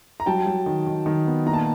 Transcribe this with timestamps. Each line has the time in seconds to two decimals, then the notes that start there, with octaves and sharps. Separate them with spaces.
0.20 A#5
0.26 F#3 G5 A5
0.46 F#3
0.66 D#3
0.87 D#3
1.06 D#3
1.26 B3
1.46 A#2 A#5
1.53 A5